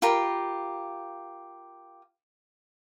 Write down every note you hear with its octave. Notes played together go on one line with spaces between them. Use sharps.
F4 G4 A#4 B5